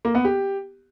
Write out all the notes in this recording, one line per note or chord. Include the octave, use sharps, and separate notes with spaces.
A#3
B3
G4